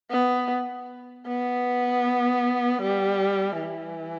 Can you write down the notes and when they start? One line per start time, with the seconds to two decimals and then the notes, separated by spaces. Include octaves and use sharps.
0.11 B3
1.27 B3
2.82 G3
3.60 E3